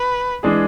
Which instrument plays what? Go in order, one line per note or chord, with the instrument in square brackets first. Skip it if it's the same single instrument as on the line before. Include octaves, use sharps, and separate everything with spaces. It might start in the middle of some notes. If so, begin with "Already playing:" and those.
Already playing: [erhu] B4
[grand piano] E3 G#3 D4 G#4